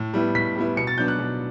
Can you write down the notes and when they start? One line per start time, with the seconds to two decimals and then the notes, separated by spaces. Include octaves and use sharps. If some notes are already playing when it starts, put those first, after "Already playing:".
Already playing: A2
0.14 G3 B3 E4
0.35 A2 B6
0.56 G3 B3 E4
0.77 B2 C#7
0.87 A6
0.98 F#3 B3 D4 G6
1.08 F#6
1.19 B2